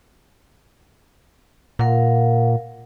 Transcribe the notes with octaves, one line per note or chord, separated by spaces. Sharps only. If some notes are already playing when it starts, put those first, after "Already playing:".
A#2 A#4 F5 F#5